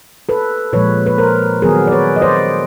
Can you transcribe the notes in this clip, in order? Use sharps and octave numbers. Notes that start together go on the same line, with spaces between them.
A4 B4
A#2 F3 G#3 B4 C#5
B4
A#4 C5
D#3 F#3 B3 G#4 A#4
D5
B4 C#5
D#5
C5 D5